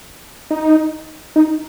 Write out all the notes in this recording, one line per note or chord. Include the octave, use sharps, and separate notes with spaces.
D#4
D#4